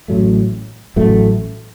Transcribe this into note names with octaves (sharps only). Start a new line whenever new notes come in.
A1 A2 F#3 A3
A1 A2 F#3 A3